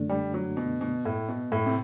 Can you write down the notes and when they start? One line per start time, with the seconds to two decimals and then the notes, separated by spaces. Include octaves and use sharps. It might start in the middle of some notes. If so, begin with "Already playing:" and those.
Already playing: F#2 D3 A3 D4
0.09 G3
0.34 F#3
0.57 B2
0.81 B2
1.05 A2
1.29 B2
1.52 A2
1.66 C3